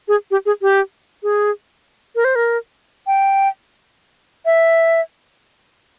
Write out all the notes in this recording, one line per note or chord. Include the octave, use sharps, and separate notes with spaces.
G#4
G4
G#4
G4
G#4
A#4
C5
A#4
G5
E5